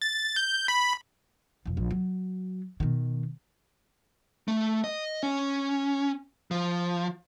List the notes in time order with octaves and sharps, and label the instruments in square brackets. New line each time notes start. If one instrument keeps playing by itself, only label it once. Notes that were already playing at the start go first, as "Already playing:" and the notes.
[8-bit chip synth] A6
G6
B5
[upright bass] E1 F2
A#1
F#3
B2 D#3
[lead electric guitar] A3
D#5
C#4
F3